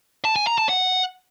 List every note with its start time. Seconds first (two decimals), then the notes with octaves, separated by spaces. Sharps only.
0.25 A5
0.36 G#5
0.47 A#5
0.58 A5
0.69 F#5